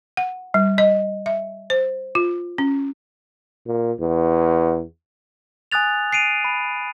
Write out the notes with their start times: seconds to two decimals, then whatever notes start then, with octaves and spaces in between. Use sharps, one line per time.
0.17 F#5
0.54 G3
0.78 D#5
1.26 E5
1.70 C5
2.15 F4
2.58 C#4
3.67 A#2
4.00 E2
5.72 G#5 D#6 F#6 A6 F7
6.13 C7 D7 D#7 F7
6.44 B5